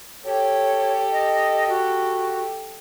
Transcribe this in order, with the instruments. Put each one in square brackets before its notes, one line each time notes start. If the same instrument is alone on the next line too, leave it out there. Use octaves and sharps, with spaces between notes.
[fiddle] G4 A4 [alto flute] C#5
[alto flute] D#5
F#4